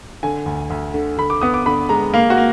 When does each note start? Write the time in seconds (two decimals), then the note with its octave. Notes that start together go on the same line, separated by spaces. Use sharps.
0.23 D3 G#5
0.46 D2
0.70 D2
0.94 D3
1.18 D3 B5
1.30 D6
1.41 B3 D#6
1.54 D6
1.66 D3 B5
1.89 G#3 A#5
2.14 A#3 F5
2.30 F#4
2.37 A#3